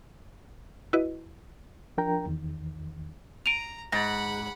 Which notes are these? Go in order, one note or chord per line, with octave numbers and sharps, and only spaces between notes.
E4 F#4 B4 D#5
F3 D4 A#4 G5 A#5
E2 D#3
A#5 D7 D#7 F7
G#2 F#5 B5 A6 A#6